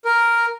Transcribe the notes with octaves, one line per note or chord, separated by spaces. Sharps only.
A#4